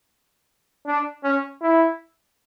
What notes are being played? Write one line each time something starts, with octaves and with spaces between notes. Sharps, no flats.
D4
C#4
E4